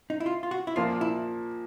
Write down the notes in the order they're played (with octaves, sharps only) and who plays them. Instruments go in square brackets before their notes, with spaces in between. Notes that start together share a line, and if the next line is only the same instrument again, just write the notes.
[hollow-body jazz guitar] D#4
E4
F4
F4
F#4
E4
[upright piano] A#2 F3 A#3 [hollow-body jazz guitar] F4
[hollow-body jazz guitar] E4